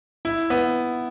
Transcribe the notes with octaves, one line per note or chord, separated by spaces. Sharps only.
E4
B3